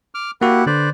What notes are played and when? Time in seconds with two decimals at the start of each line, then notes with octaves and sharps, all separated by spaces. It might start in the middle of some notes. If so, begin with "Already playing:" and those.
0.15 D6 F6
0.41 A#3 E4 F#4 G4 F#5
0.66 D3 B4 C5 D5